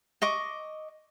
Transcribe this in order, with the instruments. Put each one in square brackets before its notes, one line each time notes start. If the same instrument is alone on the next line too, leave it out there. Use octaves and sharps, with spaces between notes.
[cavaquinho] D#5 C#6 D6